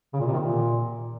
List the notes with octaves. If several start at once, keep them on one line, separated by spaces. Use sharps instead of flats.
C#3
A#2
C3
D#3
A#2